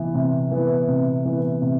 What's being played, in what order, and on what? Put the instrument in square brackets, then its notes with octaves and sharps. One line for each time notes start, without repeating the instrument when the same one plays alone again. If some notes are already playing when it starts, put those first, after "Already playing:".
Already playing: [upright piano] C3 E3 B3
C3
E3 B3
C3
E3 B3
C3